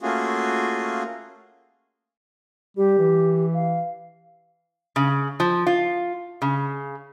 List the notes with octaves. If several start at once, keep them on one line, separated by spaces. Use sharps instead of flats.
A3 A#3 C#4 F4 F#4 G#4
G3 G4
E3
F5
C#3
F3
F4
C#3